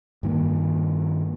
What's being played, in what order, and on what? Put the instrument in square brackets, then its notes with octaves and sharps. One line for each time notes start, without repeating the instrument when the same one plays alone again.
[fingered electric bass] G2 D#3 A#3